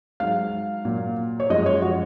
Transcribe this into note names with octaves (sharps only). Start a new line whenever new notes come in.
G#2 F#3 F5
A#2 F#3
C#5
F#2 F3 G#3 D#5
C#5
F#4